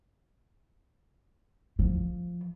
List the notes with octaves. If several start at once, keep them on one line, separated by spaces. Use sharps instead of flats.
F3